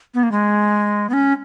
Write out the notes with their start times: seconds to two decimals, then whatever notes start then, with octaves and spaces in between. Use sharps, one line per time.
0.14 B3
0.23 A#3
0.32 G#3
1.10 B3
1.13 C#4